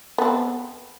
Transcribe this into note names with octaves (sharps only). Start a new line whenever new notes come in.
B3 C4 A4